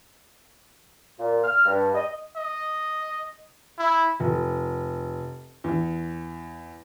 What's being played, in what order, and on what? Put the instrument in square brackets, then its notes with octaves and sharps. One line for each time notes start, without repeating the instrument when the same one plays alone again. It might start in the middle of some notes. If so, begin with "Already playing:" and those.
[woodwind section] A#2
F6
G2
D#5
[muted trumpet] D#5
E4
[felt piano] F1
E2